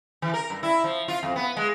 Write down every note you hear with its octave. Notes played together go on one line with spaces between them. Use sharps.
E3
A#4
G2
E4
F3
F4
F2
B3
G#3